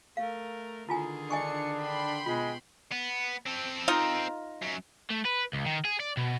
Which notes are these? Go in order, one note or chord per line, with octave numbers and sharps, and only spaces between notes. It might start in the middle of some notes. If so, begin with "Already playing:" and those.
A3 A#4 F5
D3 D#3 E4 F4 G#4 G#5
D4 D#5 G#5 C#6 C#7
G5 B5 C6
B2 G#3 F4
B3
C4 A4
D#4 F4 A#4
F#2
A3
B4
C#2
D#3
G#4
D5
B2